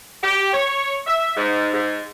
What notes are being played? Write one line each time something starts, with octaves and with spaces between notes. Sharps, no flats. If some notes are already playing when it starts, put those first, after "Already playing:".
G4
C#5
E5
G#2
G#2